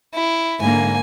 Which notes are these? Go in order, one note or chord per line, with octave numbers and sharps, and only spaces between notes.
E4
G#2 D3 A#3 G#5